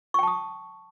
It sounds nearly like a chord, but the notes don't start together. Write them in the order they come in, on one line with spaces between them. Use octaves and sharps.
C#6 G5 A5 D#6